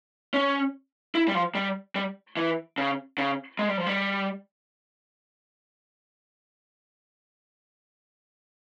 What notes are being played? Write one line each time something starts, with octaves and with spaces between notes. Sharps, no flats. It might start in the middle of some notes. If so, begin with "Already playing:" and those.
C#4
E4
G3
F3
G3
G3
E3
C#3
C#3
G#3
G3
F3
G3